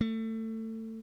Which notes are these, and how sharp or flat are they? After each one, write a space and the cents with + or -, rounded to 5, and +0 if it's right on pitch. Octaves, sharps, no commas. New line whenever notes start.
A3 +25